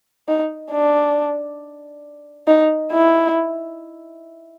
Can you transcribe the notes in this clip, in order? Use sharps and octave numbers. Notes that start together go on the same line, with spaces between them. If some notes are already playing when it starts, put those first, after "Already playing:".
D#4
D4
D#4
E4